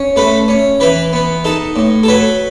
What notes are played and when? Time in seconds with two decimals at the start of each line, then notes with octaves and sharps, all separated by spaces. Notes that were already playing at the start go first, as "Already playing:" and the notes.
Already playing: C#4
0.16 A3 B4
0.48 C#4
0.80 E3 B4
1.13 B3
1.44 D#4 A4
1.76 A2
2.03 A4
2.08 F#3 B4